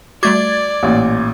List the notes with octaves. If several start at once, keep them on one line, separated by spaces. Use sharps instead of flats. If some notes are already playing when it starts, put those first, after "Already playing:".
G3 A3 F#4 D5 D6 G#6 A6
A1 A#2